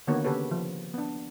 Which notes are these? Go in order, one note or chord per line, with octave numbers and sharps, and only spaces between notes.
D3 D#3 A#3 B3 F#4 C#5
C#3 G4 A4 B4 C#5
F3
B3 D4